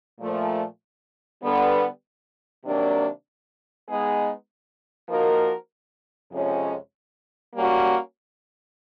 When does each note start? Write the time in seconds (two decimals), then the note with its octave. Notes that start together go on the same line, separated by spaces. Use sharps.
0.20 A#2 F3 A3
1.42 D3 G3 B3
2.64 C3 D#3 F#3 A#3 D4
3.87 G#3 B3 D#4 G#4
5.09 F3 A#3 D#4 F#4 A#4
6.31 F2 C3 F3 G#3 C#4
7.53 G3 A#3 C#4 F#4